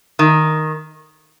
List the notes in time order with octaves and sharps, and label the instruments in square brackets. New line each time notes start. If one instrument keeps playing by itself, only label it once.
[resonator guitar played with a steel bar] D#3